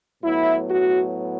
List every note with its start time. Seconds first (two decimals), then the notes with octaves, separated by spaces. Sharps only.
0.23 A2 F#3 B3 E4
0.68 F#4